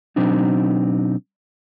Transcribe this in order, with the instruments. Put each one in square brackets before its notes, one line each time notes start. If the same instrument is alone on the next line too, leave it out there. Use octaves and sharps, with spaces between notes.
[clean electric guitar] B2 F#3 C4 D4 D#4